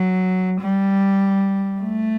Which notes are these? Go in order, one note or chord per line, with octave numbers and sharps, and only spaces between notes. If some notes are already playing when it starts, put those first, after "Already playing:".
Already playing: F#3
G3
A3